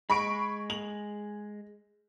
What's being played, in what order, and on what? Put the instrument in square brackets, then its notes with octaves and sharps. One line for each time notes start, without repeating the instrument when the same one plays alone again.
[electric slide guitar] G#3 [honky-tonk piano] B5 C#6 D7
[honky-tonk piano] F#7